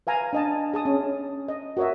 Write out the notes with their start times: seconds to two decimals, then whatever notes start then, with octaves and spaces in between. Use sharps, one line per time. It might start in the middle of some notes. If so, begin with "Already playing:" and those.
0.07 B4 F5 G#5 A#5
0.33 D4 D#5 A5
0.74 G#4 A5 D#6
0.85 C#4
1.48 D#5
1.77 F#4 A#4 C#5 D#5 E5